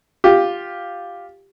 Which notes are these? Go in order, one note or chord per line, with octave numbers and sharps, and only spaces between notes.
F4 G4